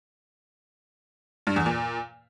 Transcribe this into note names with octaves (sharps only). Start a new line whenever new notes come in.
G2
E2
A#2